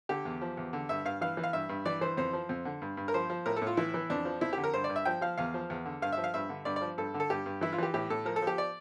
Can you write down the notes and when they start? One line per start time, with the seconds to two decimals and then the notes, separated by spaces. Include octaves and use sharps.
0.09 D3 G4
0.25 E2
0.41 F3
0.57 E2
0.73 D3
0.89 G2 E5
1.05 G2 F5
1.21 E3 F5
1.37 E3
1.43 F5
1.53 G2 E5
1.69 G2
1.86 E3 D5
2.01 E3 C5
2.17 F2 C5
2.33 F3
2.49 F2
2.65 D3
2.82 G2
2.97 G2
3.08 A#4
3.14 F3 C5
3.30 F3
3.46 A2 A#4
3.57 A4
3.62 A2 F4
3.77 E3 E4
3.94 E3
4.10 F2 D4
4.25 F3
4.41 F2 E4
4.53 D3 G4
4.64 A#4
4.74 G2 C5
4.84 D5
4.89 G2
4.96 E5
5.05 F3 G5
5.21 F3 F5
5.38 E2 F5
5.54 F3
5.70 E2
5.86 D3
6.02 G2 F5
6.12 F3 E5
6.24 F5
6.34 G2 E5
6.49 D3
6.65 G2 D5
6.76 D5
6.81 F3
6.98 G2 A4
7.14 D3
7.20 A4
7.30 G2 G4
7.46 G2
7.61 E3 E4
7.73 F4
7.78 E3 G4
7.94 A2 G4
8.10 A2 A4
8.25 F3 A#4
8.36 A4
8.42 F3 G4
8.58 D5